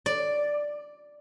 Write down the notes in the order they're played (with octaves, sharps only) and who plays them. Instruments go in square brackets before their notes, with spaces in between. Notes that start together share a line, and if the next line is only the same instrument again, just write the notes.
[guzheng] D5